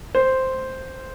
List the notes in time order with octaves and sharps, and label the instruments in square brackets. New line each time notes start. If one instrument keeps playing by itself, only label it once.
[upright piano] C5